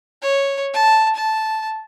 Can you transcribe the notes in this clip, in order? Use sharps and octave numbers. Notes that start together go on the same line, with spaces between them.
C#5
A5
A5